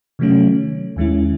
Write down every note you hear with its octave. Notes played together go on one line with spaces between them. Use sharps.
C3 D#3 F#3 A3 C#4
D#2 D#3 G#3 C#4 E4